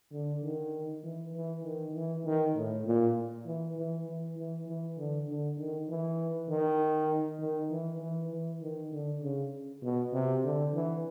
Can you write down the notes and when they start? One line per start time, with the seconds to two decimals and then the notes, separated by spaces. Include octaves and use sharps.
0.12 D3
0.43 D#3
1.03 E3
1.34 E3
1.64 D#3
1.94 E3
2.25 D#3
2.55 A2
2.86 A#2
3.46 E3
3.76 E3
4.07 E3
4.37 E3
4.67 E3
4.98 D3
5.28 D3
5.58 D#3
5.88 E3
6.49 D#3
7.40 D#3
7.70 E3
8.01 E3
8.31 E3
8.62 D#3
8.92 D3
9.22 C#3
9.82 B2
10.13 C3
10.44 D3
10.74 E3